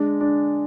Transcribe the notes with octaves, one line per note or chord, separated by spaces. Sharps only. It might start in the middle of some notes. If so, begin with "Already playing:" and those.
Already playing: G#3 D4
D4